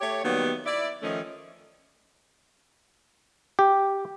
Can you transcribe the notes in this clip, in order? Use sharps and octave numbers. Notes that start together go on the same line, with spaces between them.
A3 G4 C#5
D#3 F#3 G3 A#3 B3
E4 D5
D#3 F3 A3 C#4 D#4
G4